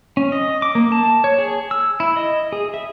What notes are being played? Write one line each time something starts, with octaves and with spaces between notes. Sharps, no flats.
C#4
D#5
D6
A#3
A5
C#5
G#4
E6
E4
D#5
G#4
E5